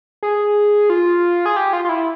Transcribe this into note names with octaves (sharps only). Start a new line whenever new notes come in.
G#4
F4
G#4
G4
F4
F4
E4